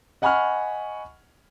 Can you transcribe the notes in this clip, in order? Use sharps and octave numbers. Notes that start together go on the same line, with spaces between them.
D#5 F#5 G#5 B5 C#6 F6